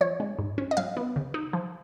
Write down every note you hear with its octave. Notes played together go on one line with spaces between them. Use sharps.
F3 C#5
G#3
G#2
C#4
D#5
F#3 F5
B3
C#3
D#4
F3